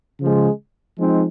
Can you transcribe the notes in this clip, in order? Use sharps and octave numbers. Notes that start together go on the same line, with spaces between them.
C#3 F3 G#3
F3 G#3 C4 D#4